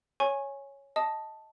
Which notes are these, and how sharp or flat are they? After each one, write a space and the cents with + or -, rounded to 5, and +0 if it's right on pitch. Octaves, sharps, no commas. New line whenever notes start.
C#5 +0 G#5 +0 C#6 -25
D#5 +15 A5 +0 D#6 +0